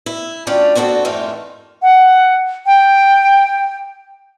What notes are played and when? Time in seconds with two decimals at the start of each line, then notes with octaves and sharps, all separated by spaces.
0.06 E4
0.47 D2 C#4 D4 F4 D5 G5
0.75 B3 C4 D4 F#4 A4
1.05 F2 G#2 D#3 E3 A3 F4
1.81 F#5
2.64 G5